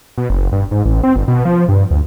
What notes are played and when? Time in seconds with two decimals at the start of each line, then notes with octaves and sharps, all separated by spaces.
0.18 B2
0.30 F#1
0.52 G2
0.71 G#2
0.85 A1
1.03 C4
1.16 G1
1.28 B2
1.45 F3
1.69 G2
1.91 D2